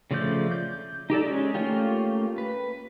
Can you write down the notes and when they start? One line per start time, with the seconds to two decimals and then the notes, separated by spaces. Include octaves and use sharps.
0.11 C#3 F3 A3 D5 G6
0.51 G6
1.10 D#4 G4 A4 D5
1.26 G#3 C#4 G#4
1.54 A3 A#3 C#4 F4 G4
2.38 B4